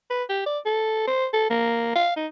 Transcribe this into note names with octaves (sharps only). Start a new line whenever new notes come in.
B4
G4
D5
A4
C5
A4
A#3
F5
D#4